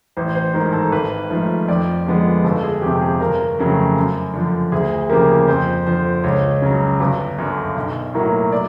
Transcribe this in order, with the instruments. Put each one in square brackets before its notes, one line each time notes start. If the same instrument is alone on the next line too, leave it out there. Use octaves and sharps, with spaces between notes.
[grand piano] A1 C5
C5
G#2 D#3 A#4
A4
G#1 B4
G#2 F3 A3
F2 D5
D3 F3 G#3 B3
G1 A4
G#4
F2 C3 G4
G#4
G1 A#4
F2 C#3 F#3 A3
F#2
D3 F3
D2 G#4
C#3 F3 A#3 G4
F2 C5
D3 F3 C5
C#2 C#5
C#3 F#3
G1
F#2 D3
B1
A2 F#3 A#3
D5